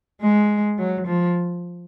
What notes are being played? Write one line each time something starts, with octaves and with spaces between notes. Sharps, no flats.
G#3
F#3
F3